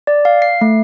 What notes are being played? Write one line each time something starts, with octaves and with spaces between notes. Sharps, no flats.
D5
F5
C7
A3